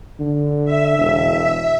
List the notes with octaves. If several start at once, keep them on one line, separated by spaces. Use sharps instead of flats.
D3
E5
E1